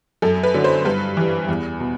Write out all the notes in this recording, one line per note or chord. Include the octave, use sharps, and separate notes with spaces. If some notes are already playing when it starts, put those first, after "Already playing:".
F#2 A4
B4
D3 F#3
C5
G2 B4
E3 G3
E2
B2